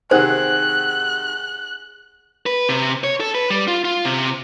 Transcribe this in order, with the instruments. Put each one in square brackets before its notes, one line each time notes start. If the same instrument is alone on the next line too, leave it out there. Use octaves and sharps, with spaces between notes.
[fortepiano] C3 D#3 [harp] G#4 F#5 [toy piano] C5 [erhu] F#6
[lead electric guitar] B4
C3
C#5
A4
B4
G3
F4
F4
C3